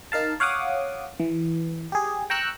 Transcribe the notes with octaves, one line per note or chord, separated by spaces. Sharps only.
D#4 A#4 F5 A5
C#5 F5 F#5 D6 D#6
E3
G4 G#4
G5 A#5 C#6 E6 F#6